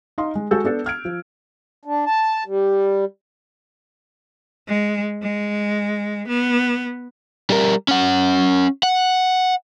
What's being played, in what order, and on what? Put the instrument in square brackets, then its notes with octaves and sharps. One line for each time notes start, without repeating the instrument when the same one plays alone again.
[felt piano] D#4 D#5 F5 C6
G#3
G#3 F#4 A4 E6 G6
B3 D4 A4
F6 G#6 D7
F3
[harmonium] D4
A5
G3
[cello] G#3
G#3
B3
[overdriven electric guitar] G3 A#4
C#4 F#5
F#5